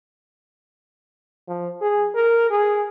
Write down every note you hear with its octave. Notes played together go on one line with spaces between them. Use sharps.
F3
G#4
A#4
G#4